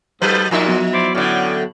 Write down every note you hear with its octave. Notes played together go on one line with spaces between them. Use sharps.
G#2 F3 F#3 A3 B4
A#2 F3 D#4 E5
F#3 B3 F#4
E4 C5 D5
A2 D3 E3 C#4 D4